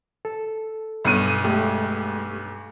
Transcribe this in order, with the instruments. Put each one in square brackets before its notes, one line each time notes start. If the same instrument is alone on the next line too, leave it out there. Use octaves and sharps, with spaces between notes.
[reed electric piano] A4
[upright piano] B1 G2 D#7
[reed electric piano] G#3 A3 G4